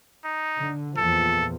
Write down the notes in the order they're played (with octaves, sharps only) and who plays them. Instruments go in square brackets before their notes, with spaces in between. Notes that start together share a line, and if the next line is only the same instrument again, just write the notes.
[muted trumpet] D#4
[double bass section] D3
[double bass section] E2 A#2 F3 [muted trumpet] A4